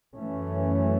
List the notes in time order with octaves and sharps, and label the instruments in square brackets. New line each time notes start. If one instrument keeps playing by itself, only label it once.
[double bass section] F#2 E3 A3 C#4